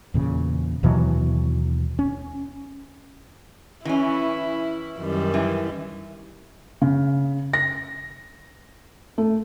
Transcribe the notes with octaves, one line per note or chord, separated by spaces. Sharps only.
E2 A#2 C#3
D#2 B2 E3 F#3
C#4
E3 C#4 E4
F#2 D#3 G3
E3
C#3
A#6
A3